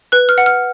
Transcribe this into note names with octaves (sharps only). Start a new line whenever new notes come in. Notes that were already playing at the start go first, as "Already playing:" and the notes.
B4 F#6
F6
F#5
F6